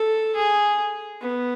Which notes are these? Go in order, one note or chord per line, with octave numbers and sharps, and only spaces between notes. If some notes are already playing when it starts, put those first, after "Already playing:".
Already playing: A4
G#4
B3